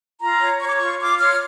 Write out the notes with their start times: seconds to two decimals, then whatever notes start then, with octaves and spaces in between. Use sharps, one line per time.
0.20 F4 A#5
0.40 C#5
0.60 C#5 C#6
0.68 D6
0.77 F4 C#6
1.01 F4 D6
1.20 C#5 F6